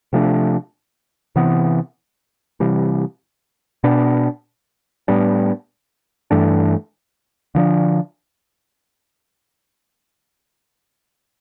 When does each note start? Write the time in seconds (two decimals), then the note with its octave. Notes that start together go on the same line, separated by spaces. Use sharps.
0.13 C3 F3 A3 D4
1.36 C3 E3 B3
2.60 C3 E3 G3
3.84 B2 B3 D4
5.08 A2 G3 B3 D4
6.31 G2 E3 A3 D4
7.55 D3 F3 B3 D4